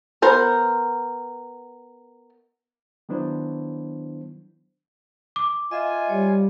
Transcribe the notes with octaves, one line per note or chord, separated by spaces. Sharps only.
B3 A#4 C5
D#3 F#3 B3 D4 E4 C5
D6
F4 D#5 E5 G#5
G3 C#5